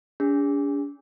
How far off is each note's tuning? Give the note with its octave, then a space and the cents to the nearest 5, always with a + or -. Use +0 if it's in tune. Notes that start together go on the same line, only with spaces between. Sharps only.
D4 -45 G#4 -40